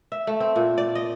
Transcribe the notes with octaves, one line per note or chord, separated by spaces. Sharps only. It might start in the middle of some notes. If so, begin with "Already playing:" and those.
E5
A3
C4
A#2
D5
D#5